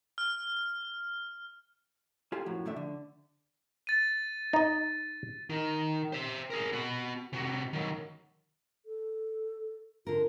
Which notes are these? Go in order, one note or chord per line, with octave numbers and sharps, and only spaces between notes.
F6
F4 G4 A4 C5 G#5
F#2 A2 F3 F#3
F#2 D3 F3 A3 E5
D3
A6 D#7
D#4 D#5
D#3
C5 E5
G#4 A#4
B3 F#4
C3 F#4
D#3 F#3
A4
D3 F4 A#4